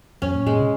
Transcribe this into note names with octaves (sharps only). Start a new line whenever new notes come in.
F#2 C#4
A#2
A#2 G#3
C3